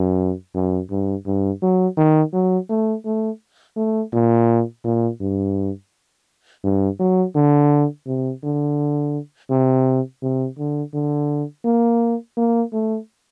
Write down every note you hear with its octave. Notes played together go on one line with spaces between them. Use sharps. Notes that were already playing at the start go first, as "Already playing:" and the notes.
Already playing: F#2
F#2
G2
G2
F#3
D#3
F#3
A3
A3
A3
A#2
A#2
G2
G2
F#3
D3
C3
D3
C3
C3
D3
D3
A#3
A#3
A3